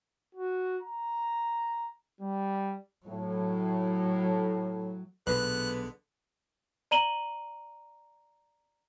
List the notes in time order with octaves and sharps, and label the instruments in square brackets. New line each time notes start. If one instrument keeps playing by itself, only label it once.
[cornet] F#4
A#5
G3
[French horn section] A2 [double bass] F#3
[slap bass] B1 A#2 [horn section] D3 G#3 B3 [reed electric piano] B4 [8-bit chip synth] F#6
[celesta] D5 A#5 D#7 F#7 G7